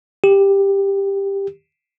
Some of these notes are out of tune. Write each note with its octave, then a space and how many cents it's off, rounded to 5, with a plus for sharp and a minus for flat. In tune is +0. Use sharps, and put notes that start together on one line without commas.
G4 +10